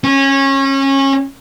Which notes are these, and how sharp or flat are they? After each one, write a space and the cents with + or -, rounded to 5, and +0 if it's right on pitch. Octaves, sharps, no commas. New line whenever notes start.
C#4 -25